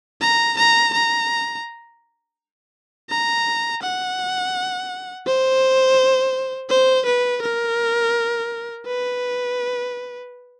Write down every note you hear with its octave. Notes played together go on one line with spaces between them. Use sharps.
A#5
A#5
A#5
A#5
F#5
C5
C5
B4
A#4
B4